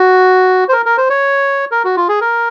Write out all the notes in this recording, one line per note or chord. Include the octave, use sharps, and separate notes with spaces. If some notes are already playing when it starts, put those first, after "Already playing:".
Already playing: F#4
C5
A#4
A#4
C5
C#5
A#4
F#4
F4
G#4
A#4